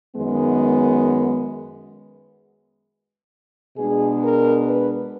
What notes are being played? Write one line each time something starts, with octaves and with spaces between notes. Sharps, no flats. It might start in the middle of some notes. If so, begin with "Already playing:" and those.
F#2 D#3 G#3 B3
B2 G#3 D4 G#4
A#4
B4